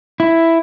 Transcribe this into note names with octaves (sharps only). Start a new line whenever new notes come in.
E4